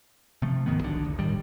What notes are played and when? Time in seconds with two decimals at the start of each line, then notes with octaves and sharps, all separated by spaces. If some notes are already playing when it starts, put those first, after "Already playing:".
0.42 C3 F3 A3
0.66 D1 G#2 D#3 B3
0.81 B1 D3
1.05 E1
1.19 A2 D#3 G3